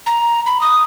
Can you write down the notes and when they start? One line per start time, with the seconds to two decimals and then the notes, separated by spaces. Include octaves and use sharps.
0.06 A#5
0.46 B5
0.61 D#6